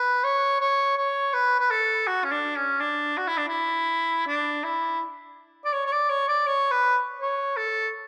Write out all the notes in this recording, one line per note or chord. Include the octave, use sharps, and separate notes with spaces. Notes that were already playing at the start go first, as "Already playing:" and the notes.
Already playing: B4
C#5
C#5
C#5
B4
B4
A4
F#4
C#4
D4
C#4
D4
F#4
E4
D4
E4
D4
E4
D5
C#5
C#5
D5
C#5
D5
C#5
B4
C#5
A4